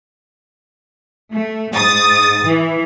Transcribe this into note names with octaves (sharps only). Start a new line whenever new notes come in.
A3
G#2 D#6 A6
E3